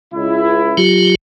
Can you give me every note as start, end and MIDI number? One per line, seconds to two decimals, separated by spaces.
0.14 0.80 37
0.14 0.80 64
0.78 1.15 54
0.78 1.15 65
0.78 1.15 67